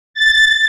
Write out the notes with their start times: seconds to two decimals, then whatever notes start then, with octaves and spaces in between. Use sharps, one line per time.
0.14 A6